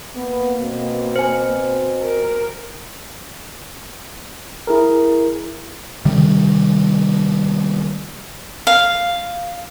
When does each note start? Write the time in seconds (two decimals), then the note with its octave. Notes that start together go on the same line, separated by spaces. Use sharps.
0.15 A#3 B3
0.60 B2 C4
1.16 C5 G#5
2.01 A#4
4.67 E4 G#4 A#4
6.05 C3 D#3 G3
8.67 F5